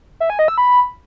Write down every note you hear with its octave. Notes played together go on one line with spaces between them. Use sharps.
E5
G#5
D#5
E6
B5